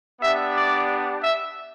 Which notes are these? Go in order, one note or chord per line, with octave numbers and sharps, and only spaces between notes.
B3 D4 G4 E5
D5
E5